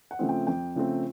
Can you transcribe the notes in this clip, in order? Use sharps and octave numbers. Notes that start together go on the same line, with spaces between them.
F#5
C#3 F3 A3 C4
G5
F2 G5
C#3 F3 A3 C4